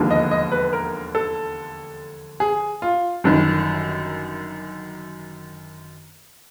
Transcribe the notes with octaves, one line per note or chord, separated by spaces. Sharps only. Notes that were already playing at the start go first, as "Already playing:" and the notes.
Already playing: E1 D#2 D3 F3 A#3
D#5
D#5
B4
A#4
A4
G#4
F4
G1 F#2 D#3